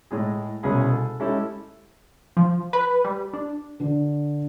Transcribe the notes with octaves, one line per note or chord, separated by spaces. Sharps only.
A2 G#3 G#4
C2 B2 C#4 G#4 B5
A4
G#3 C#4 E4 G4 A4
F3
B4
G3
D4
D3